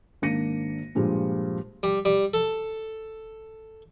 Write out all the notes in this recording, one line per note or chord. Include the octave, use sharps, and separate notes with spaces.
G#1 A#3 D4 A#6 C#7 D#7
G2 A#2 F3 G3 G#3
G3
G3
A4